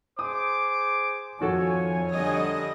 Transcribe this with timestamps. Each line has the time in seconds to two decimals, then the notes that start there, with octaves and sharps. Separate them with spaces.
0.19 G#4 C5 D6 D#6
1.41 F2 D#3 F3 F#4 A4 C#5 G#5
2.12 D3 G3 D#5